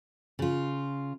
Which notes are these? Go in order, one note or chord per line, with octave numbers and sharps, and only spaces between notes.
C#3 F4